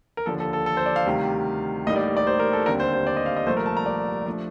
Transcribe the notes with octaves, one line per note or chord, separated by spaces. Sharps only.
A#4
D#2 D3 F3 A4
A4
A4
A4
C5
D5
F5
D2 C3 D#3 G3 D4
A1 A2 G3 A#3 D#4 D#5
D5
D5
C5
A#4
A4
D#2 D3 G3 C4 A#4
C5
C5
D5
D#5
F5
D#5
C2 A#2 F3 A3 C5
A#4
A5
A#5
D5
F3 A3 D4